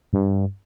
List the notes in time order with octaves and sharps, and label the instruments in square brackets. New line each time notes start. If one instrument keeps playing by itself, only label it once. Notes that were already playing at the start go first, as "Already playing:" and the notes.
[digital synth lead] G2